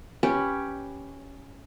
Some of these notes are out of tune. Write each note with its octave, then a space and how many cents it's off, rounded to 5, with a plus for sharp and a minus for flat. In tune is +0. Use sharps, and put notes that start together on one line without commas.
C#4 +0 G4 +0 B4 +0